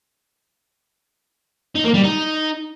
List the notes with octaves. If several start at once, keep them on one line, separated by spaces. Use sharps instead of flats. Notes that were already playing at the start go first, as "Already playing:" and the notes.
D#4
A#3
G3
D#4